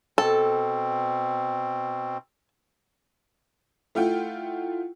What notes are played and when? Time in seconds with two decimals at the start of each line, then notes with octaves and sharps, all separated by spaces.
0.18 B2 C4 A4
3.95 A3 E4 F4 F#5 G5